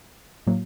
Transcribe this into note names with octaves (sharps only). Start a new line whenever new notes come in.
A2 F#3 A#3